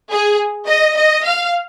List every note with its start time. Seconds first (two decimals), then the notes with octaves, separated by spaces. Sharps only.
0.11 G#4
0.68 D#5
0.96 D#5
1.25 F5